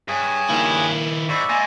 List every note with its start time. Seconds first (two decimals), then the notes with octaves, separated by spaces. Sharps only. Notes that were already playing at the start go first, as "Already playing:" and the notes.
0.08 G2 G#4 C#5
0.50 D#3 A#3 E4 A#4
1.29 G#2 D5 E5 B5 C#6 D6
1.49 G#3 A#3 G#5 C6 A6